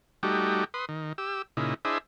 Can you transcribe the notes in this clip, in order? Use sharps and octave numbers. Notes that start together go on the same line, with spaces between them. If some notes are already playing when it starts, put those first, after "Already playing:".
G3 A3 D#4 F#4 G4
B4 C6 D#6
D#3
G4 E6
A#2 C#3 D#4 E4
D4 E4 G#4 C5 D#5 E5